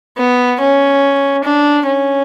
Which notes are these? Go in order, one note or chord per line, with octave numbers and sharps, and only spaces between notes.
B3
C#4
D4
C#4